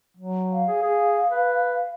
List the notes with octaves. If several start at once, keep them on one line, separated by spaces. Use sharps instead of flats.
F#3
F5
G#4
G#4
B4